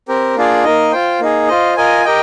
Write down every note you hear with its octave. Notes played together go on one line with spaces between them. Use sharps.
C4 G4 A#4
A#3 D4 F4 G#4 D5
A#3 D#4 A#4 D#5
F4 C5 G5
A#3 D#4 G#4
F4 C5 D#5
F4 A#4 D#5 G#5
G4 A#4 D#5 G5